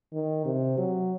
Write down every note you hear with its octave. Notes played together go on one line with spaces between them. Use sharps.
D#3
C3
F#3